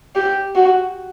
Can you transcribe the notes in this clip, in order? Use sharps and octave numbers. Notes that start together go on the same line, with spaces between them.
G4
F#4